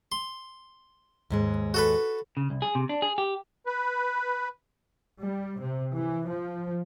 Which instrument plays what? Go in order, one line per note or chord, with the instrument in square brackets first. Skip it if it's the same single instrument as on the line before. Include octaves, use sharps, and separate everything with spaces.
[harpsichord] C6
[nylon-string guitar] D#2 G#2 G#3
[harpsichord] F#4 A4 B4
[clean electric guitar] C#3
C2
G#4
C3
D4
G#4
G4
[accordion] B4
[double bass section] G3
C3
E3
F3